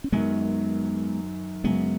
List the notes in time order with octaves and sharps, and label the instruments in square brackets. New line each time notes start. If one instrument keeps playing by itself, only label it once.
[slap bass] C#4
[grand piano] F#2 D#3 F#3 [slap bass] G#3 B3
[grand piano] F#2 C#3 F#3 [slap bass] G#3 B3